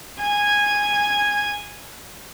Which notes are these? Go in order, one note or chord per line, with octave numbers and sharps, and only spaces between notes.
G#5 G#6